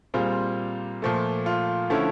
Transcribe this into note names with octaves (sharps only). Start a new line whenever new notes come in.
A#2 G3 C4 F4 G#4
A#2 F3 A3
F4
D3 F3 A3 C#4 E4